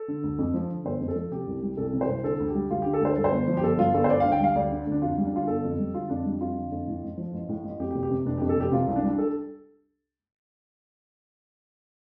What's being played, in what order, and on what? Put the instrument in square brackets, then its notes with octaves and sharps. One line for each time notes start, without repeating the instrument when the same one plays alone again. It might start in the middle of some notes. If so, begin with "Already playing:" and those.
Already playing: [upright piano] A4
D3
D2
F2
F3
D3
G1 C5
F2
A4
F3
C3 G4
C2
G3
C2 A4
C3
C5
C2
D3 A4
D2
G4
G3
D2 F4
D3 G4
A4
D2 C5
G2 A4
C5
G1
F3
G4
G1 A4
G2 F4
G1 A4
C5
D3 D5
D2 F5
G5
G3 F5
D2 D5
D3
D2
D4
F2 F4
G3
D4
D3 F4
G1 A4
F2
G3
D3 F4
F2 D4
G3
F2 F4
D3
F2
A2
A1
F3
A1
A2
A1
F2 G4
G4
F1
G4
C3
F1 D4
F2 G4
A4
F1 G4
C3 F4
C2
D4
G3
A4